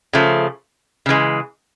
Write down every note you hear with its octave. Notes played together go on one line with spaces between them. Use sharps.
C#3 F3 A3
C#3 E3 G#3